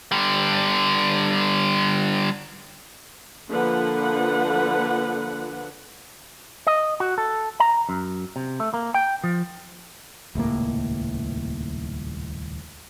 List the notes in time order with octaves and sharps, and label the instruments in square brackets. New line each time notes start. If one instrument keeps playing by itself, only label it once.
[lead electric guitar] D3 G3
[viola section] D3 F3 A#3 B4 F#5
[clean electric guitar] D#5
F#4
A4
A#5
F#2
C3
A3
A#3
G5
F3
[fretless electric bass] D#1 C#2 A2 A#3